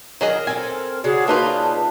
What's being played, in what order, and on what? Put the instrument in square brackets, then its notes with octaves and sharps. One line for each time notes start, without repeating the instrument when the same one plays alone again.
[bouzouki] D#3 [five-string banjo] F#3 G#4 D#5 [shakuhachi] A#4
[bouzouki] C4 D4 A4 [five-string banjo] G#5
[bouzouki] C#3 D4 [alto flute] F#4 [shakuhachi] G#4
[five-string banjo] A#3 D#4 F4 [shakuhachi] B4 [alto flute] A5